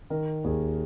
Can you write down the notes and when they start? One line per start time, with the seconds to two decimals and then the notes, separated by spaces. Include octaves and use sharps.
0.10 D#3 A#4
0.44 D#2 G#4